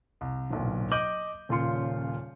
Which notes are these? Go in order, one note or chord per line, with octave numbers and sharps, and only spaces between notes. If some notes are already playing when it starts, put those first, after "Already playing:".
C2
D1 B1 A#2
D#5 D6 G6 D#7 F#7
D#1 A#2 C#3 F4 C6 C#7